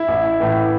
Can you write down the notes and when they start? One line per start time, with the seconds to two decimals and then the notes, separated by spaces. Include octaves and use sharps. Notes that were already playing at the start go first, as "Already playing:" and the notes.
Already playing: E4
0.08 A1
0.40 A2 E3